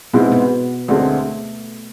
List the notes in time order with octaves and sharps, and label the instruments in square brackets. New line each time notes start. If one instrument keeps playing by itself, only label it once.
[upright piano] G#2 G#3 C4 E4 [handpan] B2 B3
[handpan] B2 B3
[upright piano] D2 D3 G#3 C4 [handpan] A3